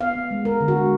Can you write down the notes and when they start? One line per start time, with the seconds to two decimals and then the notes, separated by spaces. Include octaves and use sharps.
0.01 B3 F5
0.15 B3
0.31 G#3
0.45 G#3 A#4
0.60 D3
0.68 F#4
0.76 G#3